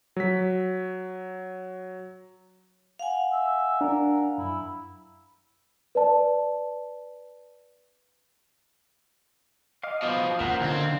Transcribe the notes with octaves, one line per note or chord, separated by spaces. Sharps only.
F#3 B6
F5 F#5 G#5
E5
D4 A#4
F#2 E4
B4 D5 A5
D#5 F5 D6 F6
B2 F3 D#6
A#2 C#4 A#4 C5 F5 F#5
D#2 D3 C4